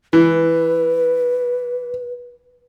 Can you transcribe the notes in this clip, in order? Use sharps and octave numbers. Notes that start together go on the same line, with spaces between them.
E3 B4